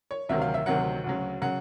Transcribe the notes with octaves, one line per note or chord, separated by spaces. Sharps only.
C#5
D2 C3 D#3 F#3 E5
F5
E5
D2 C3 D#3 F#3 F#5
D2 C#3 F#3
C#3 F#3 F#5